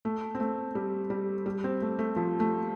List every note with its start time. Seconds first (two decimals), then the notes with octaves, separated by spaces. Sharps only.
0.05 A3
0.35 C4
0.40 A3
0.75 G3
1.10 G3
1.46 G3
1.64 C4
1.82 A3
1.99 A3
2.16 F3
2.40 A3